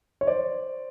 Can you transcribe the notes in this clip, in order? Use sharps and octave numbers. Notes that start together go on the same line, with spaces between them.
C#5
C5 D5